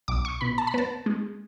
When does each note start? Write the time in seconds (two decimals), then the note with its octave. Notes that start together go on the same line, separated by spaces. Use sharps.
0.08 B1 D6
0.25 C#6
0.41 B2 B5
0.58 A5
0.67 B5
0.74 B3 A5
1.06 G#3